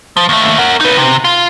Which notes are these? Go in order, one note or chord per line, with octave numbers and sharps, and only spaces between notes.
F3
D#2 A3
A#4 F#5
D#4 B4
C3
F4